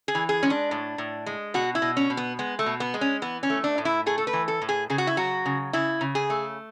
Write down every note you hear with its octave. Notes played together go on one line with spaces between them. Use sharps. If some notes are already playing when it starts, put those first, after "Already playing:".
G#4
E3
G#4
G#3 C#4
D4
A2
A2
G#3
B2 F#4
E4
B2
C#4
B2
B3
G#3 B3
A3
B2
B3
G#3
C#4
E3 B3
C#4
A3
D4
A2
E4
A3 G#4
A4
B4
E3
A4
A2
G#4
C#3 G#4
F#4
E4
F#3 F#4
C#3
C#3 E4
C#3
G#4
A3